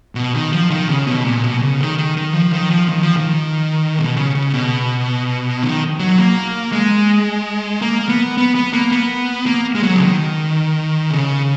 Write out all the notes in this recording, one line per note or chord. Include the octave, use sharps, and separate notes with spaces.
B2
D#3
F3
D#3
C#3
B2
A#2
B2
C#3
D#3
D#3
D#3
F3
D#3
F3
D#3
F3
D#3
B2
C#3
C#3
B2
D#3
F#3
A#3
G#3
A#3
B3
B3
B3
A#3
B3
A#3
G#3
F#3
C#3
D#3
C#3